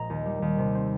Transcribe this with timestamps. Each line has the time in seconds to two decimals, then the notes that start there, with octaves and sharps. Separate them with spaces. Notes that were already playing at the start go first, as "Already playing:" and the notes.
Already playing: A#1 A#2 G#3 A#5
0.10 D#2
0.25 G3
0.42 D#2
0.58 C3
0.75 C4